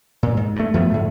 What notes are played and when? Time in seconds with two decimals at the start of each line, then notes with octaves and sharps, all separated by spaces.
0.23 A#2
0.37 G#2
0.56 G2 A3
0.74 F#2 F3 A3 B3
0.90 G#2 D3 A3